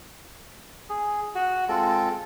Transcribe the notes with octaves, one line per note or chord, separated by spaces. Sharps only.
G#4
F#4
G#3 C4 F4 A4